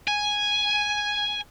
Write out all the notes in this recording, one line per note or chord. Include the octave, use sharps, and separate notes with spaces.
G#5